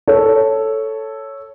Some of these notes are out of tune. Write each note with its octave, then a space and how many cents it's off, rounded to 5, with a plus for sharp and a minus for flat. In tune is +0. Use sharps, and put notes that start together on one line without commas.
A4 +0 C#5 +0